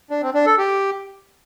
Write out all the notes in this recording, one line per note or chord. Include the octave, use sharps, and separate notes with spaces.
D4
C4
D4
A4
G4